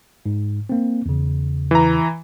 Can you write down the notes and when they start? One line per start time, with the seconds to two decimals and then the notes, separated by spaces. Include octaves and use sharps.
0.26 G#2
0.69 A#3 C4
1.06 E2 C#3
1.71 E3 A#5